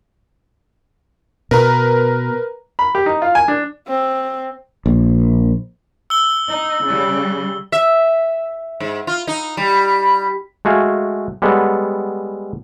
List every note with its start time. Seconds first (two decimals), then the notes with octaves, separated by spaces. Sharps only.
1.51 B2 A#4 B4 A#5
2.79 B5
2.95 G4
3.06 D#4
3.22 F4
3.35 G#5
3.48 D4
3.88 C4
4.86 A#1
6.10 E6 G7
6.48 D#4
6.85 C#3 G3
7.72 E5
8.80 G#2
9.07 F4
9.27 D#4
9.57 G3
10.65 G#3 A3 F#4 F5 G#5
11.42 G3 G#3 B3 A4 C#5 F#5